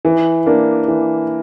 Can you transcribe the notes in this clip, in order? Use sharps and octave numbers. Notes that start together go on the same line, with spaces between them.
E3
A#3 D4
E3